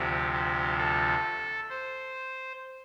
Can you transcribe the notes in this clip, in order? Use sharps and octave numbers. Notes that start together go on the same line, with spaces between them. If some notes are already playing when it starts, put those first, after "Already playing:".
Already playing: D2 C3 F3 G4
G4
A4
C5